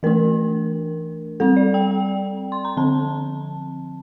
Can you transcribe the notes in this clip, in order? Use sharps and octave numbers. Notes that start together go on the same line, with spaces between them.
E3 A3 D4 A#4
G3 C4 A4
D5
G5
G5
C6
A#5
D3 F3 C4 A5